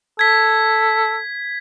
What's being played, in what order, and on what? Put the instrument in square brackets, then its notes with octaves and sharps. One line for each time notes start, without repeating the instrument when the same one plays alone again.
[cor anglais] A4 [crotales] G#6 B6